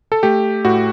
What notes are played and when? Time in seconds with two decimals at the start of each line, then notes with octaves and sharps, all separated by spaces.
0.12 A4
0.23 A3 G4
0.65 A2 F#4